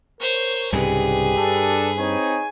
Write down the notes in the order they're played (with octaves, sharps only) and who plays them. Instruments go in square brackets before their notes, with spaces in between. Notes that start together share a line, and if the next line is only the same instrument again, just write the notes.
[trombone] A#4 [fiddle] C5 C#5
[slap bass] C2 G#2 C#3 [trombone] G4 [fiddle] G#4 B4
[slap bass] G2 [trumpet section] D4 A4
[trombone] C4 [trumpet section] D#4 C#5 G#5